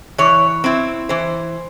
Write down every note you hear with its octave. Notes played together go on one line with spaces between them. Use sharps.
E3 C#5
C4 E4
E3 C5